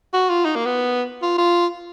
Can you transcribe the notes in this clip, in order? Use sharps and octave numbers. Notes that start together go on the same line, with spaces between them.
F#4
F4
D#4
A#3
B3
F4
F4